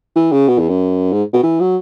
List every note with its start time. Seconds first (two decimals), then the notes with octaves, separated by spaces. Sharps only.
0.15 E3
0.32 C#3
0.48 B2
0.59 E2
0.69 F#2
1.12 G#2
1.33 B2
1.43 E3
1.60 F#3